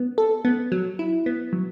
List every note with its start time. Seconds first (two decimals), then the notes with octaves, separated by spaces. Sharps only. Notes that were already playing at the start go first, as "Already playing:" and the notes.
Already playing: B3
0.18 A4
0.45 B3
0.72 F#3
0.99 E4
1.26 B3
1.53 F#3